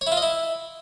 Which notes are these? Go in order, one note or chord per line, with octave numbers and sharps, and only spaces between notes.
C#5
E4
F4
D#5
E4